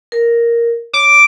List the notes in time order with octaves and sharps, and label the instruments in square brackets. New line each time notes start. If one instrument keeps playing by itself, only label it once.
[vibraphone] A#4
[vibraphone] C#5 [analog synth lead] D6